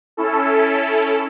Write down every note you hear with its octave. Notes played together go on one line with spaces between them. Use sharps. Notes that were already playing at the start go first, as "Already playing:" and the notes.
C#4 E4 A4